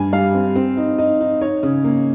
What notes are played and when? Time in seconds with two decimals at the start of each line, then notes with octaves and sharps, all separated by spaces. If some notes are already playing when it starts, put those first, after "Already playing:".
Already playing: G2 G3 G#5
0.13 G3 F5
0.34 C4
0.56 C4
0.77 D#4
0.98 D#4 D#5
1.21 D#4
1.41 D#4 C#5
1.63 C#3
1.84 A#3